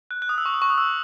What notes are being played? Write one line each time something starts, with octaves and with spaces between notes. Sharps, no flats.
F#6
F#6
D#6
E6
C#6
D#6
C#6
D#6
E6